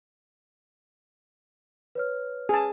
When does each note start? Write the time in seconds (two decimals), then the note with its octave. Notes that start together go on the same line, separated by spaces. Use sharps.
1.95 B4 C#5 F6
2.49 G#4 A5